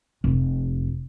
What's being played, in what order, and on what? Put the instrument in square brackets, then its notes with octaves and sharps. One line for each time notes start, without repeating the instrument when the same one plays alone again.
[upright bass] F1